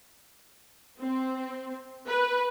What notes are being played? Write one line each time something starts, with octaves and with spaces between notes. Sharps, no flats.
C4
B4